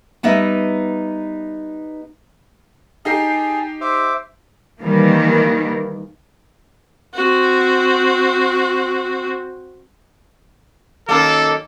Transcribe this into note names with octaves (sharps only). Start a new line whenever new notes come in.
G3 B3 D#4 D#5 E5
D#4 G4 G#4 A5 C7
C5 E5 D6
D#3 E3 G3 A#3
C4 F#4
F#2 D#3 A#3 A4